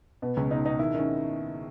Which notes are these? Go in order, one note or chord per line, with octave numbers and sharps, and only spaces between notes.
B2 B3
C#2 C#4
B2 D#4
B2 D#4
D#3 E4
D#3 C#4